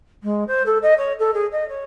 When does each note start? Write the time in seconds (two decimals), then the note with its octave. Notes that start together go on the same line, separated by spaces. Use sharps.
0.23 G#3
0.47 C5
0.66 A4
0.82 D#5
0.98 C#5
1.19 A4
1.34 G#4
1.52 D#5
1.69 C#5